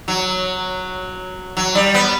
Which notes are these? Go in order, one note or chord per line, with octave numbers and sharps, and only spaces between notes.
F#3
F#3
G3
B3